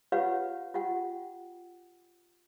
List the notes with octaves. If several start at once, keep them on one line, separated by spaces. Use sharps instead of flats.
F4 G4 B4 C#5 F5 F#5
F4 G4 F#5 G5